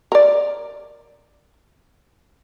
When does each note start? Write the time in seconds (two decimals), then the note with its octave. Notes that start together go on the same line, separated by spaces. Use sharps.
0.12 A#4 D5